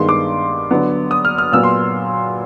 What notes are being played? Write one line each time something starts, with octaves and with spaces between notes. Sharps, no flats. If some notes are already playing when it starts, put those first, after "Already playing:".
Already playing: G2 D#3 G#3 B3 C6
D6
D3 F#3 B3
D#6
F6
F6
A#2 F#3 B3 E6
C6